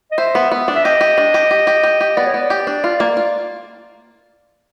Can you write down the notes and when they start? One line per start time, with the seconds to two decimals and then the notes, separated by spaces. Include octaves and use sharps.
0.11 D#5
0.18 C5 E5
0.35 B3
0.51 B3
0.68 D4
0.75 E5
0.84 G4 D#5
1.01 G4
1.18 D4
1.34 G4
1.51 G4
1.67 G4
1.83 G4
2.01 G4
2.17 B3 D5
2.27 C#5
2.34 B3 D5
2.50 G4
2.67 D4
2.84 F4
3.00 A#3
3.17 F4